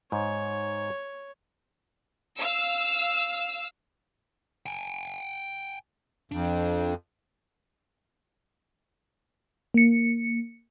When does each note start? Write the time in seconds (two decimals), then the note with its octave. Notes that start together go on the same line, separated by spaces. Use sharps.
0.12 G#2 C#5
2.36 F5 E6
4.66 G5 G#5
6.32 F2 D4
9.74 A#3 C#7